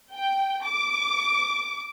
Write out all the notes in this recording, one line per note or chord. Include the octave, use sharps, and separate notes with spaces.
G5
D6